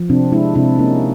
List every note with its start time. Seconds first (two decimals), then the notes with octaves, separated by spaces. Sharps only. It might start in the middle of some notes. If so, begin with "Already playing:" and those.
Already playing: F3
0.10 C3 C4 D4
0.32 G#3 D4 E4
0.55 C3 D4 E4
0.78 A#3 C#4 D#4